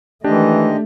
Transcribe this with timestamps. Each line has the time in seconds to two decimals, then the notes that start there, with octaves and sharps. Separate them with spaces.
0.24 D#3 E3 G#3 A3 D4 G4 D#5